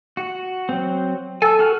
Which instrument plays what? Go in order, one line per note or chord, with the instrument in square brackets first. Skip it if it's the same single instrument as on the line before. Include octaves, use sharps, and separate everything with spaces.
[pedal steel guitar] F#4
F#3 C4
[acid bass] A4 [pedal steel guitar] G#5 E6
[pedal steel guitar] F#4 F6